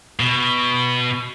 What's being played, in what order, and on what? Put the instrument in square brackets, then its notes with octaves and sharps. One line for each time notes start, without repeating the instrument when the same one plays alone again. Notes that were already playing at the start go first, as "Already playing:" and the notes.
[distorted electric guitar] B2